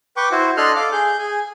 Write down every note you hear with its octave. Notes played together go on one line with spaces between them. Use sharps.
B4 G5 C#6 D6
E4 F#4 C5
D4 A4 D#5 C6 F6 F#6
A4 F5 D6
G#4 G6
G#4 G#5